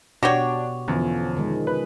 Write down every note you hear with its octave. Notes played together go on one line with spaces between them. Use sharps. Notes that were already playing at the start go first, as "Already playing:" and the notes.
B2 D4 F#4 G4 C#5
E2 D3 F3 C#4
D#3 G#3
B4